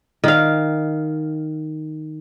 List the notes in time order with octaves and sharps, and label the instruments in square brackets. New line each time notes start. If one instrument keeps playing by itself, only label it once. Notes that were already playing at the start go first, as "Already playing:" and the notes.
[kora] D#3 F5